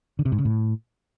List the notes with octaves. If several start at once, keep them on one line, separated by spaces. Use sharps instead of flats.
D3
C3
G#2
C#3
A2